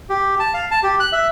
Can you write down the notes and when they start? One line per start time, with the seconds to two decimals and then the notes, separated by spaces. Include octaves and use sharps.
0.10 G4
0.40 A5
0.54 F5
0.71 A5
0.83 G4
1.00 F#6
1.13 E5